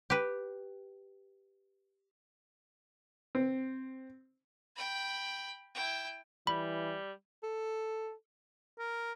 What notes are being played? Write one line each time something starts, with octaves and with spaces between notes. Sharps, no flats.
G4 B4
C4
G5 B5
E4 G5
E3 G3 B5
A4
A#4